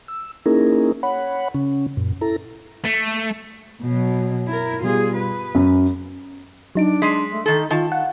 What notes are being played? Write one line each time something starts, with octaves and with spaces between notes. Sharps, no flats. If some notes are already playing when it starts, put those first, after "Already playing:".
E6
A#3 C#4 D#4 E4 G#4 A#4
C#5 F#5 B5
C#3 C#4
F#2 A#2
E4 A4 A#5
A3
B2 F#3
E4 A#4
B2 G3 F4 G#4
B4
F#2
F#3 D4 D#4 D7
G#3 C6 B6
A3
D#3 D#4 A4
D#3 F4 A5
F5 F#5